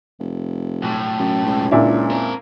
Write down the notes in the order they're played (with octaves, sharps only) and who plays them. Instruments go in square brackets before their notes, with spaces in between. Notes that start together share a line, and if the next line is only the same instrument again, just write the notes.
[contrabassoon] F1
[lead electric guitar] B1 A2
[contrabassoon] F#2
C#2
[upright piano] A#2 D4 E4
[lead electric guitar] C4 A#4